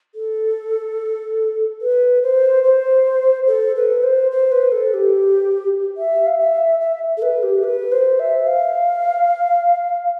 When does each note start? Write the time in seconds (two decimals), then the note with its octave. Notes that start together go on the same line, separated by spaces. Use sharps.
0.14 A4
1.81 B4
2.22 C5
2.63 C5
3.47 A4
3.76 B4
4.03 C5
4.31 C5
4.51 B4
4.71 A4
4.93 G4
5.97 E5
6.26 F5
6.38 E5
6.80 E5
7.17 A4
7.22 B4
7.42 G4
7.63 B4
7.91 C5
8.19 E5
8.46 F5